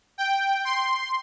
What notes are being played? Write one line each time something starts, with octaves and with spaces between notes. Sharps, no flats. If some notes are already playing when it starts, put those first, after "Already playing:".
G5
C6